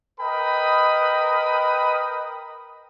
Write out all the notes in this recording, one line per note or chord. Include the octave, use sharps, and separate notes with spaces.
A#4 B4 D#5 G5 B5 D#6